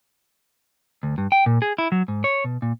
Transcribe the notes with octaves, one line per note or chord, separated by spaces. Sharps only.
D2
G2
G5
A#2
G#4
E4
F#3
G#2
C#5
B2
A#2